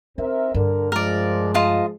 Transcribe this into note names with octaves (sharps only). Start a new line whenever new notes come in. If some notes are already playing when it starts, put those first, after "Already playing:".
C4 D#4 A#4 E5
G2 D3 A#4
F3 G#3 A#4 D5
F4 D#5 A5